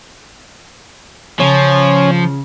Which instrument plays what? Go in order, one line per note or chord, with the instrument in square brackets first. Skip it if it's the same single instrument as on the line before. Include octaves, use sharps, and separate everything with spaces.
[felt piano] C#3 [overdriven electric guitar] F3 [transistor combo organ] C#4 C#5